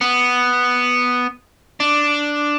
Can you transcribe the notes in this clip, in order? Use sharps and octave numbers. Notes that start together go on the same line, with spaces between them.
B3
D4